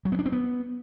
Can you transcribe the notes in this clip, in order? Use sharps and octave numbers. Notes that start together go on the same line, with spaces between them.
F#3
B3
D4
C4
B3